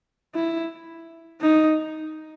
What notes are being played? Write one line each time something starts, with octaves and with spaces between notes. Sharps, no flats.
E4
D#4